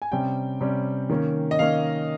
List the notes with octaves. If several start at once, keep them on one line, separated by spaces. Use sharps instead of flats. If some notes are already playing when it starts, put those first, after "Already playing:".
G#5
C3 G3 C#4 G5
C3 G3 C#4
D#3 A#3 C#4
D#5
D#3 A#3 C#4 F5